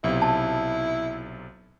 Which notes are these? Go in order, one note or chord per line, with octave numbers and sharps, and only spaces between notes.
B1 C3 E4
A5